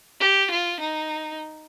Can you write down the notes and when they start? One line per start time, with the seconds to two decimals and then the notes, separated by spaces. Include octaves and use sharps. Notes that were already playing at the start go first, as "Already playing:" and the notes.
0.20 G4
0.51 F4
0.80 D#4